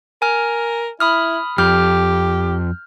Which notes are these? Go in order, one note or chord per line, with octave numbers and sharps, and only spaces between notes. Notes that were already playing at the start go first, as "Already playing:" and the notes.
A#4 G#5 F6
E4 B5 D#6 F6
F2 G4 F6 G6